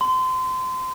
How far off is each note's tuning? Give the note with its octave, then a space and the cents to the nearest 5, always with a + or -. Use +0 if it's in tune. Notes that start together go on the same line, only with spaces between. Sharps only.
C6 -30